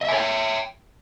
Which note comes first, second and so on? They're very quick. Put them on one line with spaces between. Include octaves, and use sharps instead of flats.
D#5 E5 G#5 C#5 G5